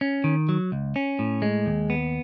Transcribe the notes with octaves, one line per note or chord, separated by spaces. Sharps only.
C#4
D#3
F#3
C#2
C#4
A2
G#3
D#2
B3